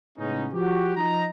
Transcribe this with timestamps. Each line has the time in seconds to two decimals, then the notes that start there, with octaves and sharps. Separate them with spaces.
0.18 A2 C#3 G#3 B3 C#4 D#4
0.53 F3 F#4 G4
0.96 F3 D#4 A#5